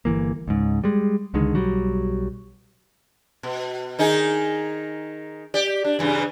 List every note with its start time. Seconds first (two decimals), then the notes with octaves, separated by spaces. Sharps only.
0.05 G1 E2 E3 A#3
0.48 C#2 G#2
0.84 G3 G#3
1.34 C#2 D3 D#3 G#3
1.54 B1 F#3 G3
3.43 B2
3.99 D#3 D#4 G#4
5.54 G4 D5
5.84 D4
5.99 G2 C#3 E3